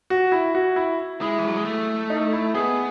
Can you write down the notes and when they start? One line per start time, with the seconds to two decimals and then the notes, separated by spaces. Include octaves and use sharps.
0.10 F#4
0.32 E4
0.55 F#4
0.76 E4
1.21 G#3 E4
1.38 E3
1.47 F#3
1.56 G#3
1.65 A3
2.10 D#4
2.33 E4
2.55 B3 G#4